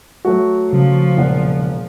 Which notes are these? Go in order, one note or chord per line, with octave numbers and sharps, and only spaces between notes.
F#3 A3 F#4
C#3 F3
E1 A#2 F#5